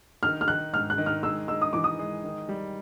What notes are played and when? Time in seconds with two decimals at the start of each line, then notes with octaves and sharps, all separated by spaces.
0.23 D#3 F6
0.41 F6
0.48 D#3 F#6
0.73 G#2 F6
0.90 F#6
0.98 D#3
1.06 F6
1.23 G#3 E6
1.48 G#3 E6
1.62 D#6
1.73 E3 D6
1.84 D#6
1.99 G#3
2.24 D#3
2.49 G3